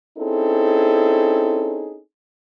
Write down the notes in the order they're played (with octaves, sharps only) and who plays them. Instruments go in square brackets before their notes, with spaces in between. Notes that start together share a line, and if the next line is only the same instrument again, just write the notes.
[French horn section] C4 C#4 D#4 E4 G#4 A4